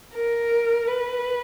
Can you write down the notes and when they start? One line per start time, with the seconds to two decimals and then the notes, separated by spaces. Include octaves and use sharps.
0.15 A#4
0.87 B4